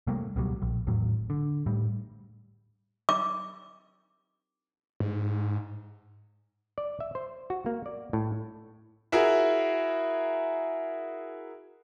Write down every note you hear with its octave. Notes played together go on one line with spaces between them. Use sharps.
C3 G3 A3 A#3
C#2 B2 F#3 G3
A#1
G#1 E2 A2 F#3
D3
A2 G3
D6
G#2
D5
E5
C5
F#4
A#3
D5
A2
E4 F#4 G#4 A#4